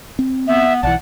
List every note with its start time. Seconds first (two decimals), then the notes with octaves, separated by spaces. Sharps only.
0.19 C4
0.47 B3 E5
0.83 B1 E3 D5 F#5 A5